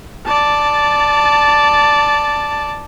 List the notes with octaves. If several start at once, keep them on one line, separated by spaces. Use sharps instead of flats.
D5 A5